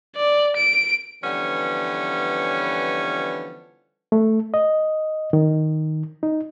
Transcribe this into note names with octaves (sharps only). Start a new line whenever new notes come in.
D5
D7
D3 E3 F3 G3 B3 C#4
A3
D#5
D#3
D#4